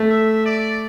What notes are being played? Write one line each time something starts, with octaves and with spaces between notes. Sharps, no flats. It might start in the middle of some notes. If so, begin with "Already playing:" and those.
Already playing: A3
E5
D5